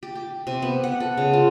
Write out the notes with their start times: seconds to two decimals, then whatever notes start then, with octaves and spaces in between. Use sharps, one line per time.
0.03 G4
0.15 G4
0.47 C3
0.62 B3
0.84 F#5
1.00 A4
1.17 C#3
1.33 F4